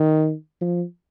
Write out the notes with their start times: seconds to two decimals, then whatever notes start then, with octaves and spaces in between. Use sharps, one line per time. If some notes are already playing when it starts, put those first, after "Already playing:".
Already playing: D#3
0.61 F3